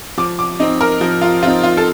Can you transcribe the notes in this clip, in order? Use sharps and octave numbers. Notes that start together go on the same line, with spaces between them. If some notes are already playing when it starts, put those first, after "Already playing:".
F3 D6
D6
C4 D#4 D#5
A#4
F3
F4
C4 D#4 F4
F4
A4